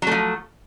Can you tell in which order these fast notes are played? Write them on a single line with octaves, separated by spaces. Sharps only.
F#3 A3 F3